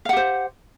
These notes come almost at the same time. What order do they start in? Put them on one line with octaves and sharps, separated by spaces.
F5 F#5 G4 C5